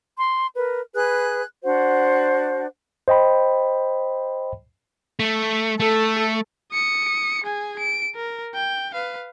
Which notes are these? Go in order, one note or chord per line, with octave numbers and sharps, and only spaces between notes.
C6
A#4 B4
G#4 B4 F#6
D4 F#4 C5 F#5
C5 D#5 G5 B5
A3
A3 A4
D#6 C#7
G#4 G#5
D7
A#4
G5
B4 F5